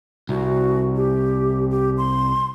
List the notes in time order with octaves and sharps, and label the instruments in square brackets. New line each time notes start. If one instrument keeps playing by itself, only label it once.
[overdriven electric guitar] C2 [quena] F#4
[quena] G4
G4
C6